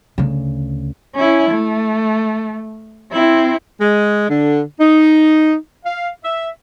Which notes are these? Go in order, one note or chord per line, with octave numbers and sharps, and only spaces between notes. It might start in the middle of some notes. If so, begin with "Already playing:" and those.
D2 C#3
C#4 E4
A3
C4 E4
G#3
D3
D#4
F5
E5